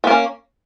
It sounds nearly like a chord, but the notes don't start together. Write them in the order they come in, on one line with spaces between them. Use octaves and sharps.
B3 A#3 C#4